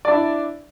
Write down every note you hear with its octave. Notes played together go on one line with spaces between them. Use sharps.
D4 E4 D5